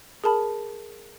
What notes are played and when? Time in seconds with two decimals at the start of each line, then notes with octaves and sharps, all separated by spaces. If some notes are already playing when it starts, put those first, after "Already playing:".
0.24 G#4 A#4 A5 B5